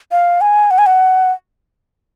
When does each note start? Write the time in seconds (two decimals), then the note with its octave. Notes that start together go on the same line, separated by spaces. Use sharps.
0.12 F5
0.41 G#5
0.71 F#5
0.78 G#5
0.86 F#5